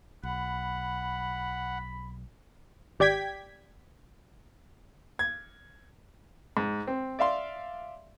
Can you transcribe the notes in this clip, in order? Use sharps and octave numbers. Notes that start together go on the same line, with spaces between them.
B1 F#5 B5
G#1 G4 D5 G5 G#6 B6
G#6
G#2
C4
D5 E5 F5 C6